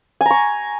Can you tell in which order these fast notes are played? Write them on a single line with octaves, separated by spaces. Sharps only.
G#5 A#5 C#6